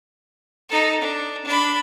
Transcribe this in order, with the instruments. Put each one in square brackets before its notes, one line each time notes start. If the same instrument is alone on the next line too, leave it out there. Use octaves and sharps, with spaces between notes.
[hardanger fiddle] D#4 A4
D4
D4 B5